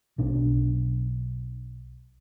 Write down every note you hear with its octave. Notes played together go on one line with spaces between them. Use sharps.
B1 D4